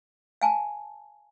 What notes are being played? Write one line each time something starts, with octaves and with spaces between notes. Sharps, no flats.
F5 G#5 A5